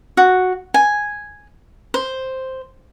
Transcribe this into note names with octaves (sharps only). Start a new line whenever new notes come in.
F#4
G#5
C5